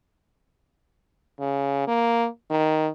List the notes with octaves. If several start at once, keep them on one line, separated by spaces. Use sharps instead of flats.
C#3
A#3
D#3